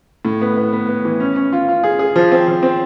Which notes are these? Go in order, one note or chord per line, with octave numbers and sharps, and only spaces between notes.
A2
B3
B3
B3
B3
E3
C#4
C#4
F4
F4
G#4
G#4
F3
C4
F3
C4